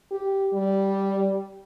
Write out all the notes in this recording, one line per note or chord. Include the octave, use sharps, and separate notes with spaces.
G4
G3